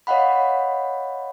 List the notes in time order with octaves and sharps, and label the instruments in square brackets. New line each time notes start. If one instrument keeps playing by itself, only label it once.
[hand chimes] C#5 D#5 F5 F#5 B5